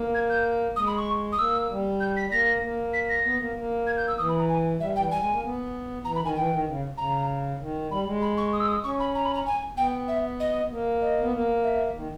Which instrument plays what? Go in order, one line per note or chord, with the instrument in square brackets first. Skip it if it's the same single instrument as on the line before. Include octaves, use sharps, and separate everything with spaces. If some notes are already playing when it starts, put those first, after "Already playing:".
Already playing: [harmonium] A#3
[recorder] G#6
G6
[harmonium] G#3 [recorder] D#6
[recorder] B5
C#6
D#6
[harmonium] A#3 [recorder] E6
[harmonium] G3
[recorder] G6
B6
[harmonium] A#3 [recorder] A#6
[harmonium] A#3
[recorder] B6
A#6
[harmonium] B3
A#3
A#3
[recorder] G#6
G6
E6
[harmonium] E3 [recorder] D#6
[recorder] B5
A#5
G#5
[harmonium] G3 [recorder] E5
[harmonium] E3 [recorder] G5
[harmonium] G3 [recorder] G#5
[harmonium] G#3
A#3
B3
[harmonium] E3 [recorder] A#5
[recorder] B5
[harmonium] D#3 [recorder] G#5
[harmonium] E3 [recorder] G5
[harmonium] D#3
C#3
[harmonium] C#3 [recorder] A#5
[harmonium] D#3
[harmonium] G3 [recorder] B5
[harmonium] G#3
[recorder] B5
C#6
D#6
E6
D#6
[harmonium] C#4 [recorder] C#6
[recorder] B5
A#5
B5
A#5
G#5
[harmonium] B3 [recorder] G5
[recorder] E5
D#5
[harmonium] A#3
[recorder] D#5
[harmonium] B3
A#3
[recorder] E5
[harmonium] D#3